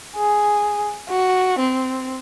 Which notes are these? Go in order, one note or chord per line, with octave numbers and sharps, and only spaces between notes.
G#4
F#4
C4